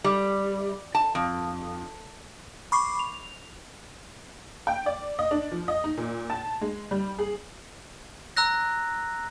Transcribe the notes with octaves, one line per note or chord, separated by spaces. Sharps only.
G3
A5
F2
B5 C#6 D6 C7
F7
G5
D5
D#5
D4
F3
D#5
D#4
A#2
A5
G#3
G3
G#4
A#5 E6 F#6 A#6